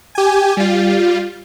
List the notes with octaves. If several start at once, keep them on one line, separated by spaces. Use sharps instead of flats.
G4 G#5
G3 F4